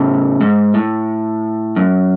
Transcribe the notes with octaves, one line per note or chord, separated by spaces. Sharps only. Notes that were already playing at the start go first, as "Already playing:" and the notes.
Already playing: A2 C#3
G#2
A2
F#2